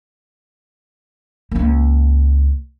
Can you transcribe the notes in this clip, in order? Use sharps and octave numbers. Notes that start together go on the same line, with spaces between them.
C#2 A#3